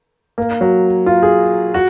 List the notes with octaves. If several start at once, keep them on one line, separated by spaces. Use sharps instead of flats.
A#3
F#3
F4
G#4
F#4